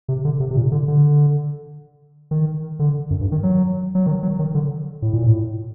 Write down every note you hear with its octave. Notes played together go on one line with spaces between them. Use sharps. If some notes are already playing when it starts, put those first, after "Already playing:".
C3
D3
C3
C3
A#2
D3
D3
D#3
D3
F#2
G2
D#3
F#3
F#3
D#3
F#3
D#3
D3
A2
A#2
A2